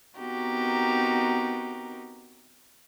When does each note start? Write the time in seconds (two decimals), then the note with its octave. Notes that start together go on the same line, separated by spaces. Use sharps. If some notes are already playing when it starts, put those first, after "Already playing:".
0.19 B3 C4 D#4 F#4 G4 A#4